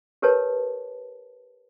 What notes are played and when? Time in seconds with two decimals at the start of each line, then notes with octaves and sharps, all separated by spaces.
0.22 G4 A#4 B4 C#5 A5